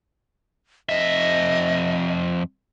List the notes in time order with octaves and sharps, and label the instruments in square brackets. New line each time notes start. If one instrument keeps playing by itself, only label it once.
[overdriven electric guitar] F2 E5 [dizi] D#5